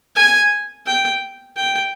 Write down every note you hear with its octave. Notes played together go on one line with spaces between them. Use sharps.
G#5
G5
G5